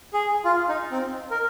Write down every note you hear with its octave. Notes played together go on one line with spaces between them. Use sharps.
G#4
F4
D#4
C4
A#4